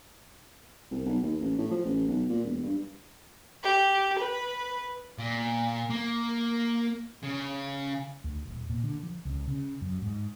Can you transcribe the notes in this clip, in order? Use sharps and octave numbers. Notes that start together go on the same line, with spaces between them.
C2
B1
D#2
A1
A2
F3
A1
B1
A#2
E1
G2
G4
B4
A#2
A#3
C#3
D2
D#1
A#2
D3
F3
C#2
C#3
F#2
G#2